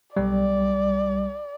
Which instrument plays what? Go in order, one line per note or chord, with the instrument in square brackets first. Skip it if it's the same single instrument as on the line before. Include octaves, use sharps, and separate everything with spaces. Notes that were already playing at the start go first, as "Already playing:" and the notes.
[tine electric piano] B1 G3 [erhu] D5